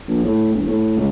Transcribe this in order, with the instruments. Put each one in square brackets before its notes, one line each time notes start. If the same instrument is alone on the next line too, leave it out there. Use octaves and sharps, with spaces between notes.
[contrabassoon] A#1
A2
E1
A2
C#2